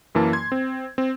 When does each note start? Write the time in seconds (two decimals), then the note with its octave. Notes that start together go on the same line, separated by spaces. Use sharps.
0.15 F#2 E3 A#3 A5
0.33 C6 G#6
0.52 C4
0.98 C4